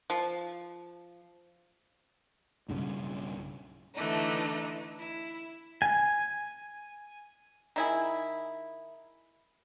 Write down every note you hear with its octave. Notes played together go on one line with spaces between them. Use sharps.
F3
B1 G2 C#3
D3 E3 A3 D#4
E4
G#5
D#3 E4 G#4